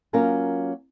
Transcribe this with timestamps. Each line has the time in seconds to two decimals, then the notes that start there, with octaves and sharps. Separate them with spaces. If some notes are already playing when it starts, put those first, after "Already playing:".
0.13 F#3 A#3 C#4 F4 A#4 F5